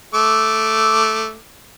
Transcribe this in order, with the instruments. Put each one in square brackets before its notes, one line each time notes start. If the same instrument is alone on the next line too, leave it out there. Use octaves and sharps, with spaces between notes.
[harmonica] A3 D6